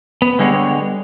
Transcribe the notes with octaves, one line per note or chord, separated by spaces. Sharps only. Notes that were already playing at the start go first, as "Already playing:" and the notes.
B3
D3 G3 G#3 B3 C#5